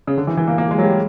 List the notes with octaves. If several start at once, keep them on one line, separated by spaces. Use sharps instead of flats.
C#3
D3
E3
E3
A#3
A#3
G#3
F#3
G3